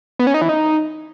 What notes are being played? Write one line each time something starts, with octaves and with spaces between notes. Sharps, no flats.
B3
C#4
D#4
E3
D#4